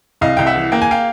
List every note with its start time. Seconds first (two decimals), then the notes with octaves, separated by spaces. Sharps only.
0.21 C2 D#5 F5
0.37 C2 G5
0.46 E5 F#5
0.55 E3
0.72 A#3 G5
0.82 G#5
0.91 F5 G5